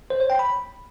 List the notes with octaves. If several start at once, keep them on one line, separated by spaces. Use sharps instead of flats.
C5
C#5
G5
B5